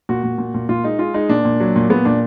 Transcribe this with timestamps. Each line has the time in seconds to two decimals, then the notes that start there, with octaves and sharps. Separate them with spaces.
0.09 A#2 F#4
0.24 A#2
0.38 A#2
0.54 A#2
0.69 A#2 F4
0.84 G#3 D#4
0.99 G#3 F4
1.14 G#3 D#4
1.29 A#2 D4
1.45 A#2
1.60 F#3
1.76 A#2
1.90 A#2 B3
2.05 A#2 D4